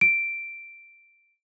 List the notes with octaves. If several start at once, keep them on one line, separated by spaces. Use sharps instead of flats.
D7